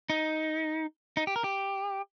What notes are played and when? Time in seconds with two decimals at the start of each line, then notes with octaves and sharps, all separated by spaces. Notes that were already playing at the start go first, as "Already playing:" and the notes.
0.10 D#4
1.17 D#4
1.27 G4
1.36 A#4
1.44 G4